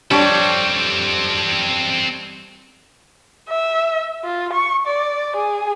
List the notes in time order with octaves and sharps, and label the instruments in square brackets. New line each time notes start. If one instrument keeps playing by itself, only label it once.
[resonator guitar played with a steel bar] G3 D4 C#5 [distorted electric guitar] C4 A4
[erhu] E5
F4
C#6
D5
G#4